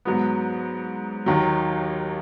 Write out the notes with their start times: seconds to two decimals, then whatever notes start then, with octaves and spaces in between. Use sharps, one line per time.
0.05 G#2 F#3 B3
1.26 D#2 D#3 F#3